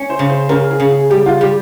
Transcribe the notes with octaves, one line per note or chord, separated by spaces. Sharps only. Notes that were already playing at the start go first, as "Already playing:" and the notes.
Already playing: C#4
C5
C#3
C5
C#3 A#4
G#4
C#3
G#4
G3 G4
F4
G3 G4